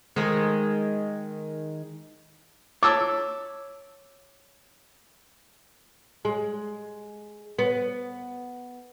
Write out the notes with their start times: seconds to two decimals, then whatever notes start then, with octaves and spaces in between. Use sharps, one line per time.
0.16 D#3 G#3
2.83 C#5 A5 D6 E6
6.25 G#3
7.59 B3